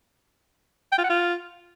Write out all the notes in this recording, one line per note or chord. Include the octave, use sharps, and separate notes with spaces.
G5
F4
F#5
F4